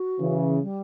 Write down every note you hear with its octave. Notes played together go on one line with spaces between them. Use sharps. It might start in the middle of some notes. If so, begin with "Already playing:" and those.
Already playing: F#4
C#3 E3
G3